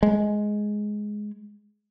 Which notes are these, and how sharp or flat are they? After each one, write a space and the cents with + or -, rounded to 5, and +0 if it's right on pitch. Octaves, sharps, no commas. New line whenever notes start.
G#3 +10